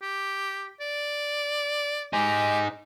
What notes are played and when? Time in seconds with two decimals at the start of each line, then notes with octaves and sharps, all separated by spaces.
0.02 G4
0.80 D5
2.13 D#4 G4 G#4